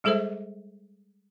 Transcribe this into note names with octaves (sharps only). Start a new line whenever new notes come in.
G3 G#3 G#4 A4 C5 E5